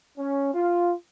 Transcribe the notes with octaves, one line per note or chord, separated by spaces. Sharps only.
C#4
F4